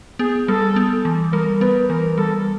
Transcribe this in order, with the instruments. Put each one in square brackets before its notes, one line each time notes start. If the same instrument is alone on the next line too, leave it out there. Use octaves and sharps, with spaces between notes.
[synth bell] B3 [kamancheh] G#4
[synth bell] G3 [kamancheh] A4
[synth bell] B3
E3
[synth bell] G3 [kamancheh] A#4
[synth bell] B3 [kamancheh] B4
[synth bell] E3 [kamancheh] A#4
[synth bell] G3 [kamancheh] A4